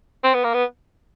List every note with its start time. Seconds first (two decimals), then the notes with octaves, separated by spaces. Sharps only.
0.24 C4
0.34 B3
0.44 A#3
0.54 B3